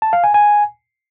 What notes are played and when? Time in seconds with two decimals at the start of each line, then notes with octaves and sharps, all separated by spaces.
0.02 A5
0.13 F5
0.24 G#5
0.34 G#5